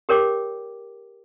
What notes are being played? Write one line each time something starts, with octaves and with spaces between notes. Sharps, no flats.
G4 A#4 C#5 G5 D6